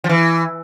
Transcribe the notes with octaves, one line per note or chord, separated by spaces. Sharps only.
F3
E3